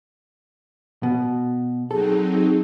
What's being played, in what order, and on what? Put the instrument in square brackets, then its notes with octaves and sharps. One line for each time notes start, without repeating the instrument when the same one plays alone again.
[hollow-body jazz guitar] B2
[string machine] F#3 C4 D#4 [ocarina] G#4 [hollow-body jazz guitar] A4